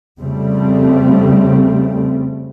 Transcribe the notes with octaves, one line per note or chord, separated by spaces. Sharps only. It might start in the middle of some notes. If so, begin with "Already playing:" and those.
F2 C#3 G3 A3 C4